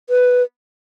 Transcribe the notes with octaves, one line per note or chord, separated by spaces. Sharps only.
B4